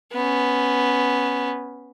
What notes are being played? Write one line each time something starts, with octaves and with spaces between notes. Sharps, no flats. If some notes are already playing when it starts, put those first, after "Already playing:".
B3 C#4